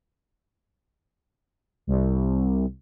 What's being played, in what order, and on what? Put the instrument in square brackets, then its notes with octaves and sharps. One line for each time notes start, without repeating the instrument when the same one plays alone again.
[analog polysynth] C2